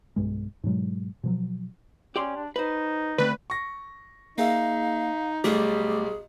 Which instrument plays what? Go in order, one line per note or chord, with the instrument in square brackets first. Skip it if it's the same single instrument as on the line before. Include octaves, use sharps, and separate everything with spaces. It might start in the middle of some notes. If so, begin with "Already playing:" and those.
[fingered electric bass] B1 G2 G#3
G#2 B2 F#3 G#3
B2 F3 F#3
[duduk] C#4 [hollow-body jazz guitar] G4 D5 C6
[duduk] D4
[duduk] D#4 [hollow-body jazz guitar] B4 C5
[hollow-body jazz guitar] D3 A3 C4 [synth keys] B4
[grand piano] C#6 A#6
[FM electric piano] A#3 G#4 E5 [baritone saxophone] D#4 [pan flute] F5
[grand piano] B1 G3 [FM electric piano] A3 D6 [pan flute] G#4